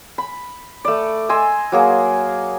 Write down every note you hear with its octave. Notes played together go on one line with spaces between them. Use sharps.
B5
A3 D5
D#5 G#5 C6 E6
F#3 A#3 G#4